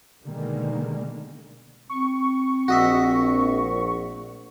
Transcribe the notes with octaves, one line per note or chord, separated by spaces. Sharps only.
B2 D3 D#3 G3 G#3 A#3
C4 C#6
A#1 F#4 D#5 E5